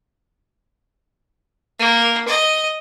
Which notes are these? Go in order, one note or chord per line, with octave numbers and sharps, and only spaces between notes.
A#3
D#5